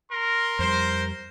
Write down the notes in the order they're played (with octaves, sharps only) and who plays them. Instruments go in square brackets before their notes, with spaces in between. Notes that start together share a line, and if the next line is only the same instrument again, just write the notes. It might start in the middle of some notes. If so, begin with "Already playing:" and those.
[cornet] A#4 [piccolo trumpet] C6
[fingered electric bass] F2 G3 [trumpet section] C5